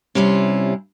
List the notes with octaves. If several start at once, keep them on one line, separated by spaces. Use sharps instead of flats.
C3 G3 C#4 E4 F4